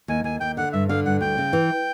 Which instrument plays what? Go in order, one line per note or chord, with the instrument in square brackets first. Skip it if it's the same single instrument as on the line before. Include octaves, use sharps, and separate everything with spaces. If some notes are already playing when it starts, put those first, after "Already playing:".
[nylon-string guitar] D#2 [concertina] G#5
[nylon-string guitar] D#2 [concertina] G#5
[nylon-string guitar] D#2 [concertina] G5
[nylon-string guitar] D3 [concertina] F#5
[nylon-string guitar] G2 [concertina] E5
[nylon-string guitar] D3 [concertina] F5
[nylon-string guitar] G2 [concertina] F#5
[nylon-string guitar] D2 [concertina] G5
[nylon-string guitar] C#3
E3